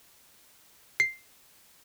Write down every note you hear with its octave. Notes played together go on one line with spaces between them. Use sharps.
C7